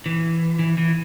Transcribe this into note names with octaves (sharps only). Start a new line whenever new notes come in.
E3
E3
E3